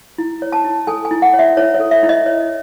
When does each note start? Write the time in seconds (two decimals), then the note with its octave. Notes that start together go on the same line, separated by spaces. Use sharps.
0.18 E4
0.42 C#5
0.52 A5
0.65 E4
0.87 A4 G#5
1.05 G#5
1.11 E4
1.22 F#5
1.34 C#5
1.39 E5
1.57 E4 C#5
1.74 C#5
1.80 A4
1.91 E5
2.03 E4
2.09 D#5
2.26 C#5